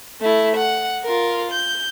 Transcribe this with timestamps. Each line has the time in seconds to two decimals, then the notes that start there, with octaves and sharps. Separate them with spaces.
0.21 A3 E4
0.57 F#5
1.04 F4 A#4
1.52 G6